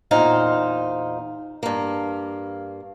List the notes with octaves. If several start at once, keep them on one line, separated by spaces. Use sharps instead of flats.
E2 A#2 D#4 C5 F5
G2 A#3